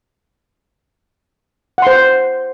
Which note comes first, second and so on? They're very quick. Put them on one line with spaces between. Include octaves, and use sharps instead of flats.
F#5 C6 C5